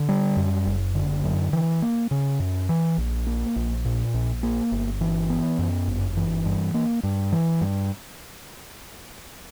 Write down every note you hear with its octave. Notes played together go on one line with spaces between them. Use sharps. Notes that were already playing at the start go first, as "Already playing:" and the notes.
Already playing: D3
G3
F#2
F#1
D3
F#2
E3
A#3
C#3
F#2
E3
A#1
A#3
A#1
A#2
A#1
A#3
G1
E3
B3
F#2
G1
E3
G2
A#3
G2
E3
G2